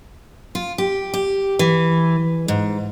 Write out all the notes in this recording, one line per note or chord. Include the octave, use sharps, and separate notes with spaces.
F4
G4
G4
E3
G#2